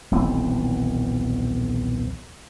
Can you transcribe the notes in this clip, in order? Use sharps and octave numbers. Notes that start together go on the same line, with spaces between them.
D#1 B1 E3 C4